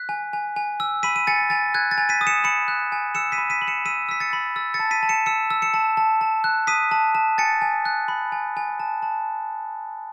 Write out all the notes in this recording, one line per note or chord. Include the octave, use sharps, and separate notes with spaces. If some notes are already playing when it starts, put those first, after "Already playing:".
Already playing: F#6 B6
G#5
G#5
G#5
E6
B5 B6 D#7
D#7
G#5 A6 C#7
G#5 A6
F#6 G#6
A6
G#5
B6 D#7
D#6
C#7 E7
B5 C#7 E7
F#6
G#5
E6 C#7 E7
B6 D#7
B5
B6 D#7
B5
C#7 E7
E6 B6 D#7
E6 B6
A6 C#7
B5
E6 A6
A6 C#7
A5
B6 D#7
A5
C#7 E7
E6 C#7 E7
E6
C#7 E7
A5
A5
A5
F#6
D#6 B6 D#7
A5
A5
G#5 A6 C#7
G#5
F#6
B5
G#5
G#5
A5
A5